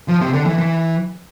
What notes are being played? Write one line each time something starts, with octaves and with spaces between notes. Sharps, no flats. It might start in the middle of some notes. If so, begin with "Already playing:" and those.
F3
C3
D3
E3
E3